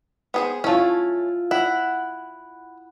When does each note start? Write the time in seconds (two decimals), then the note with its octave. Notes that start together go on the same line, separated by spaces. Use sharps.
0.34 B3 G#4 C5
0.64 A3 C#4 E4 F4
1.51 E4 F#5